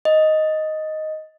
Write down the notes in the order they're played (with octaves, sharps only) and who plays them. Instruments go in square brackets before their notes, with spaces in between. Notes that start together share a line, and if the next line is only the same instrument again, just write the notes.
[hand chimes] D#5